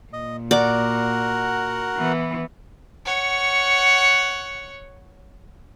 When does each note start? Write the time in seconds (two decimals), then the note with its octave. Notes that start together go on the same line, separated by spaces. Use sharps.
0.13 A#2 D#5
0.51 F#4 A#4 D5 F#5
1.97 E3 B3
3.05 C#5 F#5